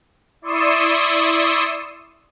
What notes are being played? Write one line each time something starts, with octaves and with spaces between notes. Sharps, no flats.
E4 D5 C6 C#6 D#6 E6